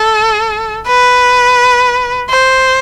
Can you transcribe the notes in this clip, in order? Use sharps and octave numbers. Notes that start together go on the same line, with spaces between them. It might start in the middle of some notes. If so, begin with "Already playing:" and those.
Already playing: A4
B4
C5